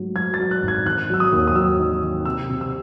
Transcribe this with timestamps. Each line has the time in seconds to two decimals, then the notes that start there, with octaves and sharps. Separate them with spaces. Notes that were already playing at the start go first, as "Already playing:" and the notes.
Already playing: G#2 F#3 A3
0.16 F#3 G#6
0.34 A6
0.40 F#3
0.51 F#6
0.62 G#1
0.68 G#6
0.86 D#3 F#6
1.10 F#3 E6
1.20 D#6
1.32 D#2
1.47 D#6
1.55 F#3 E6
1.79 D#3
2.02 D#3
2.25 C3 E6
2.49 C3
2.61 E6